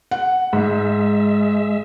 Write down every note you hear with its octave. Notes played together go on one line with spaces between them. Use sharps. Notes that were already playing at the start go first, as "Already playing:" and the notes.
F#5
G#2 G#3 E5